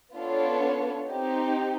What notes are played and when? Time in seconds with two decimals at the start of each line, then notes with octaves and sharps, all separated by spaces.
0.16 B3 D4 F4 A4 C#5
1.09 C4 D#4 G4